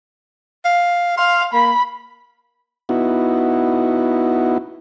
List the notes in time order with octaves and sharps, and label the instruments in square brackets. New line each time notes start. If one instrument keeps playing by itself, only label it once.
[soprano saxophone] F5
[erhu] F5 [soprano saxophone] C6
[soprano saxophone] A#3 [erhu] B5
[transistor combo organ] B3 D#4 E4 F#4